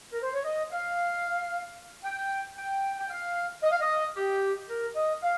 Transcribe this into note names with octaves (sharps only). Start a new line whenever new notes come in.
A#4
C5
C#5
D#5
F5
G5
G5
G5
F5
D#5
F5
D#5
G4
A#4
D#5
F5